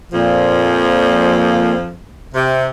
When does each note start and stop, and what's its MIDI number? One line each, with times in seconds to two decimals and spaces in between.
0.13 2.03 41
0.13 1.74 46
0.13 2.03 53
2.35 2.69 48